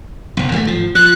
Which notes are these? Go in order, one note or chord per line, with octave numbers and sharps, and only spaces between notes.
F#1 B1
D#2 F#3 A3
G#1 F3
F3 F#6